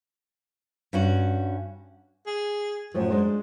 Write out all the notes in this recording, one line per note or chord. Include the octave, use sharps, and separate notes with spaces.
G2 C#4 F#4
G#4
F#2 A2 F3 F#3
G#3 D4 C5